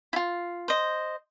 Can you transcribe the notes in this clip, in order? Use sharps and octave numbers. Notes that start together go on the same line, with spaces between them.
E4 F4
C5 D#5